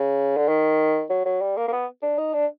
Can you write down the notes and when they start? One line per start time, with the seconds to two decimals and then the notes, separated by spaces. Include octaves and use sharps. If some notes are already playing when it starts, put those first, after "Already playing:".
Already playing: C#3
0.37 D3
0.48 D#3
1.10 F#3
1.25 F#3
1.41 G3
1.57 A#3
1.68 A#3
1.72 B3
2.03 D4
2.18 D#4
2.33 D4